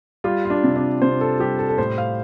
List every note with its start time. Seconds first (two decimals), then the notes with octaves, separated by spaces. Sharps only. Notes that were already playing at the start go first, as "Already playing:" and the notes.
0.24 G3 F4
0.45 F4
0.50 D4
0.63 C3
0.76 D4
1.02 C3 C5
1.21 A4
1.39 G3 G4
1.59 A4
1.69 A4
1.78 A2 C5
1.98 F5